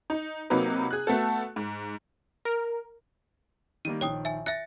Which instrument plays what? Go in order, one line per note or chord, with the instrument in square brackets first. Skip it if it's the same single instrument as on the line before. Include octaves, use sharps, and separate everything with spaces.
[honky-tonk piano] D#4
C3 F#3 A#3 D#4 B4
G#4 F#6
A3 B3 F#4 A4
G#2
[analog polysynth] A#4
[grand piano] D#3 G3 A#3 [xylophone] D#7
[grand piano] A#1 D#3 [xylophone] C#5 G5 D#6
[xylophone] E5 G#5
[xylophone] E5 F#6 [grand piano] A6 A#6 C#7